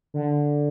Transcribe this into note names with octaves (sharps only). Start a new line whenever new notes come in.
D3